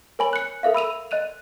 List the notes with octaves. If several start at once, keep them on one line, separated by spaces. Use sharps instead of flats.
A#4 C#5 G#5 B5 F#7
F#6 C#7
A4 A#4 E5 F5
B5 E6 D#7 F7
D#5 F#6 D#7 F7